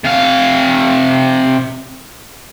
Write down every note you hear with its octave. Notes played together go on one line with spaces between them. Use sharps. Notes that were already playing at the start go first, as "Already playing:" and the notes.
C3 F5